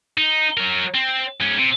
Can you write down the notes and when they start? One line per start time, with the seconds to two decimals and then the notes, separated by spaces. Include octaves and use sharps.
0.17 D#4
0.57 F#3 A#4
0.95 C4
1.41 G#2 C#4
1.59 C3